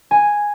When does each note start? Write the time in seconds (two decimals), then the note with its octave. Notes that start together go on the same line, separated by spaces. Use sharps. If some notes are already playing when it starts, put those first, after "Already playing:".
0.11 G#5